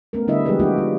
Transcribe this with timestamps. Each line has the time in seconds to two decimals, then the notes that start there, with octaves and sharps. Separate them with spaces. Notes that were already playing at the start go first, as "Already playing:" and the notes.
0.13 A3 B3 C#4 A#4
0.27 D3 G3 D4 E4 D#5 E5
0.46 F3 G3 G#3 G4 G#4 B4
0.59 F#3 A#3 D4 E4 F#4 G4
0.78 G#3 F4